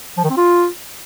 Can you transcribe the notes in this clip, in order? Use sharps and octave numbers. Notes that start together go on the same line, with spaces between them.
F3
D#3
C4
F4